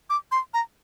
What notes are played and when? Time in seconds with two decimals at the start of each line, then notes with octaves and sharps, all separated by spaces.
0.10 D6
0.32 C6
0.54 A#5